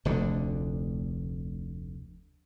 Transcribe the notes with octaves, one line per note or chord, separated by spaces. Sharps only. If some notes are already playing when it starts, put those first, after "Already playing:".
F1 D2 D3